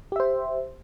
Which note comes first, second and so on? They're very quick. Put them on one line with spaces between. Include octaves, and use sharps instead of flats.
G4 E5 C5